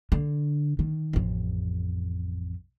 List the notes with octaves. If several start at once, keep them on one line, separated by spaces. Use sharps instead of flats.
D3
D#3
A1 F2